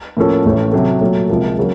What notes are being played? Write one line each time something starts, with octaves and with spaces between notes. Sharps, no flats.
A2 F3 A#3 C#4 A4
A1 A2 A3 C#4
C3 F#3 A3
A#2 F#3 A3
C#2 C3 F3 A#3
C#3 F#3 A#3